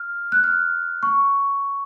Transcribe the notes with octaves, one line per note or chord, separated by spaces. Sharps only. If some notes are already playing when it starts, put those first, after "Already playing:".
Already playing: F6
F#6
F6
C#6